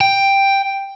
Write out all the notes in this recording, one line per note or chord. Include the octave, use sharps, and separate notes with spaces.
G5